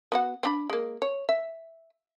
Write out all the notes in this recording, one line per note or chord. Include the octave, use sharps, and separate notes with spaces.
B3 F#4 F#5
C4 D4 B5
G#3 A#3
C#5
E5